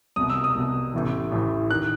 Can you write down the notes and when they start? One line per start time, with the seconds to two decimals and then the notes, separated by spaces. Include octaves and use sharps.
0.16 C2 B2 D#6
0.30 E6
0.44 D#6
0.55 C2 B2
0.94 A1 A2 E3
1.32 A1 A2 E3
1.71 D#3 F#6